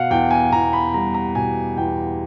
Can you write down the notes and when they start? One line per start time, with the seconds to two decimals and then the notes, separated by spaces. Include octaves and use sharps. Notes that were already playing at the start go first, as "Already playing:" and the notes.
Already playing: B2 F5 F#5
0.11 E2 G5
0.31 G#5
0.52 E2 A#5
0.73 B5
0.94 G3 A#5
1.14 A#5
1.35 B2 G#5
1.77 E2 G5